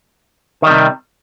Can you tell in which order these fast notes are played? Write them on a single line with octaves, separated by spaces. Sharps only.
D#3 G3 C3